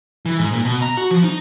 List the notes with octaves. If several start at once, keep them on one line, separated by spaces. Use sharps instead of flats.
E3
G#2
A#2
B2
A#5
F#4
F3
D#4